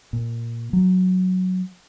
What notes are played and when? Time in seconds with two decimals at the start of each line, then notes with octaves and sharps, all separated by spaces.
0.13 A#2
0.73 F#3